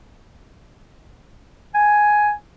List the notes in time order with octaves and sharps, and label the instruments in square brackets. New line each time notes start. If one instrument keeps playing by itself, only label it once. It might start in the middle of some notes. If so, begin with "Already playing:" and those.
[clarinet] G#5